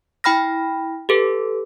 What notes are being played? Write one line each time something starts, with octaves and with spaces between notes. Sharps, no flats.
E4 G5 B5 F6 A#6
G4 A4 B4